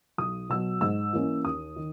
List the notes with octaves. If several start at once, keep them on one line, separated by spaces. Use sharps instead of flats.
B1 D#6
B2 F#3 E6
G#2 E6
E3 A#3 C#4
D#2 D#6
D#3